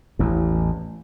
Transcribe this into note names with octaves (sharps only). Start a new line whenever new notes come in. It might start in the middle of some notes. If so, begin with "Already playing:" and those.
A1 E2